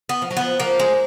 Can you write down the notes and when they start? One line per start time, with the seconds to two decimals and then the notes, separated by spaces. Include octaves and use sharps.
0.09 B3
0.22 F3
0.31 F#3
0.37 F3 B3
0.60 F3 A#3
0.80 G#3